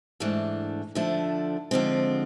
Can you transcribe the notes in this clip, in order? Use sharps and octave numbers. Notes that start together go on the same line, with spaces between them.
G#2 E3 A3 D4
D3 F3 A3 D4
D3 F3 G#3 C4